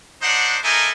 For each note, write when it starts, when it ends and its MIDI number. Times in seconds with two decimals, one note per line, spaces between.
0.21 0.57 62
0.21 0.57 63
0.21 0.57 72
0.21 0.57 78
0.63 0.90 58
0.63 0.90 63
0.63 0.90 64
0.63 0.90 69
0.63 0.90 80